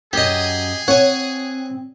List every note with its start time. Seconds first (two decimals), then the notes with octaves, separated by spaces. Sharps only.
0.13 F#2 G4 G#4 D#5
0.88 C4 C#5 F#5 G#5